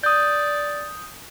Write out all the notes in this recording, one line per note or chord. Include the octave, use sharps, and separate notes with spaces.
D5 D#6 G6